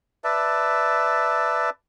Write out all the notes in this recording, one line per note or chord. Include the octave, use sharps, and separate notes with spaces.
B4 D5 E5 A5